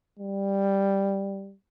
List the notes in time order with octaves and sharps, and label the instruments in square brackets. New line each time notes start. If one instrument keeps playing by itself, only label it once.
[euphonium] G3